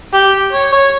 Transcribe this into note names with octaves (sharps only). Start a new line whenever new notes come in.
G4
C#5
C#5